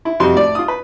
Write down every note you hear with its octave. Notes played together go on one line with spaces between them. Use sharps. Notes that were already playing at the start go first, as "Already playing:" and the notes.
E4
F2 C3 G3 C4 F#4 C6
A2 D5
F4 D#6
B4